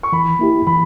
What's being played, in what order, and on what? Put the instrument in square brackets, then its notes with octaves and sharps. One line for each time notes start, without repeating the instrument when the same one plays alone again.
[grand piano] C#6
[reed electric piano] E3 [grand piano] B5
[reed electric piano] A#3 E4 G4
[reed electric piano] E3 [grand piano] B5